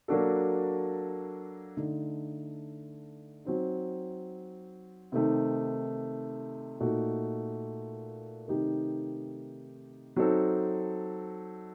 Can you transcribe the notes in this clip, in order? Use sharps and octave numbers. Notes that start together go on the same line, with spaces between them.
F#3 A#3 D4 F#4 A4
D3 A3 D#4
F#3 C4 D#4
C3 D#3 A3 D#4
A#2 A3 D#4 F#4
C3 D#3 A3 D#4 G4
F#3 C4 D#4 A4